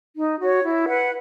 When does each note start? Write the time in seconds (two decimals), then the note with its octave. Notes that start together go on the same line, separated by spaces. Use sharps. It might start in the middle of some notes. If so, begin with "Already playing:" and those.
0.15 D#4
0.39 F#4 C#5
0.61 E4
0.86 B4 F#5